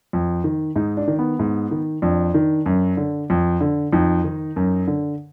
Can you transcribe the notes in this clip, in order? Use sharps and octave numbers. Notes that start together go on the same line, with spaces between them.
F2
D#3
G#2 D#4
D4
D#3
B3
G#2
D#3
F2 D4
D#3
F#2
D3
F2
D3
F2 D#4
D#3
F#2
D3